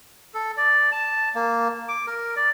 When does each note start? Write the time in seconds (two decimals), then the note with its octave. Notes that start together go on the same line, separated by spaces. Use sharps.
0.34 A4
0.57 D5
0.92 A5
1.35 A#3
1.88 D6
2.07 A#4
2.36 D5